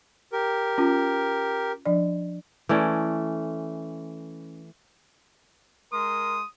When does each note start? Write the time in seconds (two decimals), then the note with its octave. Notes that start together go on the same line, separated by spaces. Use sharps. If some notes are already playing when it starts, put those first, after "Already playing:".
0.33 G4 A#4
0.78 C#4 F4
1.86 F3 D4 D5
2.69 E3 A3 C#4 D5
5.92 G#3 A#4 C6 D#6